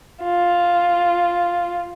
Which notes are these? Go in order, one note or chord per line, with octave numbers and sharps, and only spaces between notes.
F4